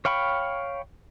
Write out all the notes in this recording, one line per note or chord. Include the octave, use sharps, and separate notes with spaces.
C#5 F5 G5 B5 C#6